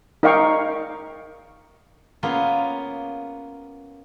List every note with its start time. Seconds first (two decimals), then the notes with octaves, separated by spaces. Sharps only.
0.23 D#4 A#4 D5 F5 G5 C#6
2.23 A#3 B3 C#4 F4 G#4 A#4